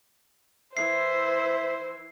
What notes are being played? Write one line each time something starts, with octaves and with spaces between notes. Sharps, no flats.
E3 E4 C5 E5 C7